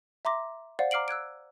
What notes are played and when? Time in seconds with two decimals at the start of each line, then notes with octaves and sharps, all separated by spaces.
0.25 E5 A#5 C6 D6 A#6
0.79 C5 D5 F5 F#5
0.91 A#5 D6 F6 C7 D7 F#7
1.08 E6 F#6 G#6 D7